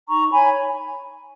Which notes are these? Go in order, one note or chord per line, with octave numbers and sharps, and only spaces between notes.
D#4 A#5 C#6
C#5 G#5 B5